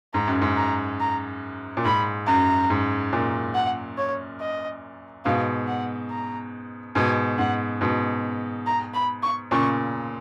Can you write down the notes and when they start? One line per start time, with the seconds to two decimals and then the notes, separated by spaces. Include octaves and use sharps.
0.14 G#2 A#5
0.28 F#2
0.42 G#2
0.57 A#5
1.00 A#5
1.77 A#2
1.85 G#2 B5
2.27 F#2 A#5
2.70 G#2
3.13 F#2 A#2
3.55 F#5
3.98 C#5
4.40 D#5
5.25 G#2 B2 F5
5.68 F#5
6.11 A#5
6.95 G#2 B2 G#5
7.38 G#2 F#5
7.81 G#2 B2
8.67 A#5
8.94 B5
9.23 C#6
9.51 A#2 C#3 C#6